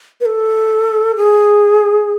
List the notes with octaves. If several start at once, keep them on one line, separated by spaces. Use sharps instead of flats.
B4
A4
G#4